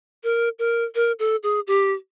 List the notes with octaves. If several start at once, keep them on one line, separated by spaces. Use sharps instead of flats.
A#4
A#4
A#4
A4
G#4
G4